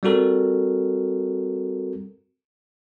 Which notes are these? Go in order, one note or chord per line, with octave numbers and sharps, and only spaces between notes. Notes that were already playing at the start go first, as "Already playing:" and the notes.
G3 C4 F#4 A4 A#4